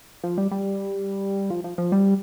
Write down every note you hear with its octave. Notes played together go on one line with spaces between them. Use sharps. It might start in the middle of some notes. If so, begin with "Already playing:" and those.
F3
G3
G3
F3
F3
F3
G3